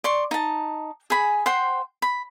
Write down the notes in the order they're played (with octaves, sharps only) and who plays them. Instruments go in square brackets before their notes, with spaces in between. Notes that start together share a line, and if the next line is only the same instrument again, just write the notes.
[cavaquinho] D5 C6 C#6
D#4 A5
G#4 G#5 B5
C5 F#5 G5 C6
B5